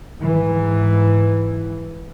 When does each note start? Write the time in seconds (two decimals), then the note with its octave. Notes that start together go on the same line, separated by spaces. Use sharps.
0.19 G#2 E3